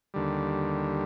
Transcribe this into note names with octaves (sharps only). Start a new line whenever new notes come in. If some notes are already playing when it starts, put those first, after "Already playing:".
D#2 D3 G3